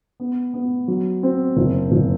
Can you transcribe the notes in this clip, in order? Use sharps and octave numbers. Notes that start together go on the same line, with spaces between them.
B3
B3
F#3
C4
F#1
F#1